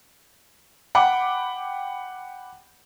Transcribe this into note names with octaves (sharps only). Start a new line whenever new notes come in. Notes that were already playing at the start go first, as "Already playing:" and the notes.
F#5 G5 B5 D6